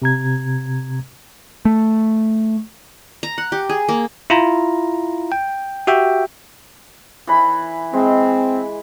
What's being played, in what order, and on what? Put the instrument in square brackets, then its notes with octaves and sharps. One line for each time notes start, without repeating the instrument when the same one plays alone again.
[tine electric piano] C3 A#5 G#6
[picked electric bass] A3
[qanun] A#5
F#5
G4
G#4
A#3
[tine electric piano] E4 F4 A#5
G5
F#4 G4 E5 G5
[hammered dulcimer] E3 B5
[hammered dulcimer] G#3 [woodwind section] C4